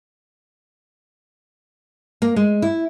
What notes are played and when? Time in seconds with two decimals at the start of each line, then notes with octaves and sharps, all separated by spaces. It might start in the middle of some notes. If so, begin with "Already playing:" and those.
2.22 A#3
2.36 G#3
2.62 E4